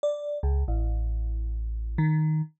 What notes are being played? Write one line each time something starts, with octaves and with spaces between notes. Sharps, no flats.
D5
C#2
A1
D#3